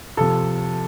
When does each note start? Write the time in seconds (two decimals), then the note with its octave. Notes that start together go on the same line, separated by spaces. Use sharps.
0.17 C3 F3 A4